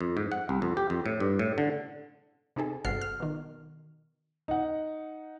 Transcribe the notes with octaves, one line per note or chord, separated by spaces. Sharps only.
F2
G#2
F#5
C2
F2
G4
F2
A2
G2
A2
D3
C3 D#4 G#4 A4
G1 C3 F#4 A4 F6 C7
F6
B2 D#3
D#4 F#5